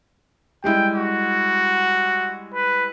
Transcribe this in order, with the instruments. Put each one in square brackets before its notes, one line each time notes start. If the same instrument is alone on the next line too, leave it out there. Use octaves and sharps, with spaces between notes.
[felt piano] G3 G#3 E4 [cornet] G5
[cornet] F#4
B4